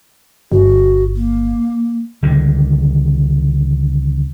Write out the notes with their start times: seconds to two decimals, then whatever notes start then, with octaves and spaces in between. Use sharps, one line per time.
0.52 G1 F#4
1.16 A#3
2.23 C#2 D3 D#3 G3